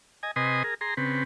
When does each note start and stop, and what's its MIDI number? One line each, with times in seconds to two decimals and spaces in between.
0.23 0.31 75
0.23 0.31 80
0.36 0.63 48
0.36 0.63 71
0.36 0.63 75
0.36 0.63 80
0.36 0.63 84
0.36 0.63 87
0.64 0.74 68
0.64 0.74 70
0.81 0.94 68
0.81 0.94 82
0.81 0.94 84
0.97 1.24 49
0.97 1.24 60
0.97 1.24 71